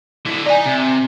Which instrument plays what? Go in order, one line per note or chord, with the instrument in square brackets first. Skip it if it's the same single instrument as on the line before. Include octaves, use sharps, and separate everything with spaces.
[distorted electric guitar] D3 E4
[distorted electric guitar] D#4 A#5 [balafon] D5 G#5
[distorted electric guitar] C3